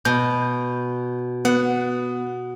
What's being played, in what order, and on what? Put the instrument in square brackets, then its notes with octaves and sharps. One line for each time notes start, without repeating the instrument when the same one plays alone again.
[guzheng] B2 [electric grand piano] G6
[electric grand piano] B3 [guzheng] F#5